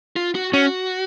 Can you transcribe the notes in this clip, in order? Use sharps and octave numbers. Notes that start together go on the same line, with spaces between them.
F4
F#4
C#4 F#4